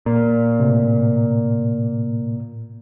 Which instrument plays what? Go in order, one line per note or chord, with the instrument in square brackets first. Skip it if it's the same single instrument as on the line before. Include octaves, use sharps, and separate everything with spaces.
[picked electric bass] A#2
[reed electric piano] A2 C3